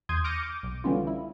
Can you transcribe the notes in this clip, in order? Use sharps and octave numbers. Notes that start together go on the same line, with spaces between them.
E2 C6 D#6 G6 G#6
D6 F6 G6 A#6 C#7 D#7
D6
B1
D3 E3 G3 B3 C#4 F4
E4